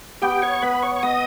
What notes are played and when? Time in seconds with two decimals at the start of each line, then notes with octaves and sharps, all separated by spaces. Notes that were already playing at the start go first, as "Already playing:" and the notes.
0.22 B3 G4 G5
0.42 C#5 C#6
0.62 B3 B4 B5
0.82 C#5 C#6
0.96 C#6
1.03 B3 D#5 D#6